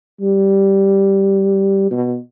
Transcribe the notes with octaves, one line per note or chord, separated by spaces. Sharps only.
G3
B2